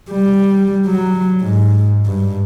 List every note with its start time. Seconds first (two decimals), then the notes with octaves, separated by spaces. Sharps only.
0.11 G3
0.87 F#3
1.41 G#2
2.07 G2